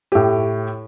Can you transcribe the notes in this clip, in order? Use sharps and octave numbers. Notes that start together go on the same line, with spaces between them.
A2 G4